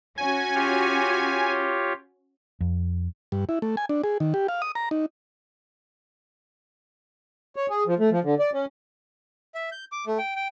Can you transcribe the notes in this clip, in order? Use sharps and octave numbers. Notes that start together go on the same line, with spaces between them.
C#4 F#4 G#5
F4 G4 C#5
F2
G2
E4
A3
G#5
D4
G#4
D#3
G4
F5
D#6
A#5
D#4
C#5
G#4
F3
A3
F3
D3
D5
C#4
E5
G6
D6
A3
G5
G5